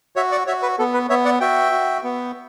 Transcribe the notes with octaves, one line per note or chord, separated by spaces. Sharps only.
F#4 C#5 E5
D5 F#5
F#4 C#5 E5
B4
B3 A4
B4
B3 C#5 E5
D5 F#5
F#4 E5 G5
F#4
B3